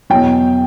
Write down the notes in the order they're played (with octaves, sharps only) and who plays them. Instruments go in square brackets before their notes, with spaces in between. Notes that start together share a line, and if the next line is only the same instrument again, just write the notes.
[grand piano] E2 B2 F#3 G5